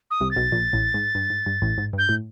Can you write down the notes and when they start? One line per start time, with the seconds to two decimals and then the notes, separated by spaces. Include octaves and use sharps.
0.11 D#6
0.21 C2 C3
0.31 A6
0.36 B1 B2
0.52 A#1 A#2
0.73 A1 A2
0.94 G#2
1.15 G2
1.30 G#2
1.46 G2
1.62 A1 A2
1.78 G#2
1.93 G2
1.98 G6
2.09 A2